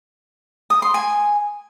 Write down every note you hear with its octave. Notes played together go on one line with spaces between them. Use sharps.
D#6
C6
G#5